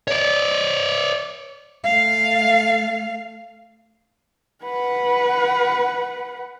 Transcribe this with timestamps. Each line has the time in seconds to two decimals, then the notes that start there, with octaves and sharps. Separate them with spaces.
0.08 C#5 D5
1.84 A3 F5
4.64 B4 F#5